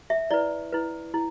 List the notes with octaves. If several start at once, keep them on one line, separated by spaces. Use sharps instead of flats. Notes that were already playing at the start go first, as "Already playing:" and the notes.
E5
E4 B4 D5
E4 B4
E4